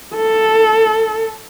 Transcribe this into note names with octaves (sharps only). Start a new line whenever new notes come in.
A4